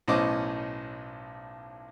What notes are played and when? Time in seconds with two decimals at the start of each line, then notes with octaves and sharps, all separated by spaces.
0.08 B1 A2 C#4 C5 D#5 D6